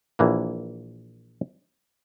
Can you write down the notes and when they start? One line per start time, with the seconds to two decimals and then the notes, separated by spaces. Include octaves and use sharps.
0.19 A#1 E3 A#3